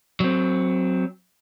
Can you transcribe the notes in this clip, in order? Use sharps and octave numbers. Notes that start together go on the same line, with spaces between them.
F#3 C4